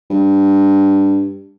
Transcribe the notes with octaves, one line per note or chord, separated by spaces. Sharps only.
G2